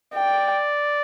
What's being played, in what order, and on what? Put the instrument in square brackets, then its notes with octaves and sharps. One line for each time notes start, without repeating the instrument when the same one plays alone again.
[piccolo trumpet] D5 [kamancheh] G5